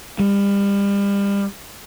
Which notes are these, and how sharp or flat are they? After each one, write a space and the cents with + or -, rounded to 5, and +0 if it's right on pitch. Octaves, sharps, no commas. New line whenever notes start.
G3 +35